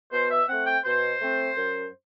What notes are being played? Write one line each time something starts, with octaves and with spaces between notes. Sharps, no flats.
B2 C5
E5
A3 C4 F#5
G5
B2 C5
A3 C4
F#2